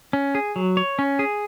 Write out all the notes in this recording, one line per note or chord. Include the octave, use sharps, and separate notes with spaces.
C#4
G#4
F#3
C#5
C#4
G#4